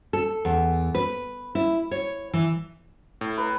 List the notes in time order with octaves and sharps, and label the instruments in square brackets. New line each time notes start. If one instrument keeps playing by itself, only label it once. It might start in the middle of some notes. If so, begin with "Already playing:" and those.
[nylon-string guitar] A4
E2
B4
E4
C#5
E3
[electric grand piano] A2
[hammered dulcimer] B4